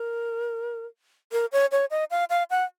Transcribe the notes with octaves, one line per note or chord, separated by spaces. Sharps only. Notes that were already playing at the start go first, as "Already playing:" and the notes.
Already playing: A#4
A#4
C#5
C#5
D#5
F5
F5
F#5